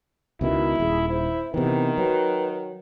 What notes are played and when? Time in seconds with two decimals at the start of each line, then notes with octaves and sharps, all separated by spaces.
0.41 C#2 B2 D#3 E4
0.80 D#1 G#4
1.09 E4 C5
1.54 C3 D#3 E3 B3
1.98 F#3 B4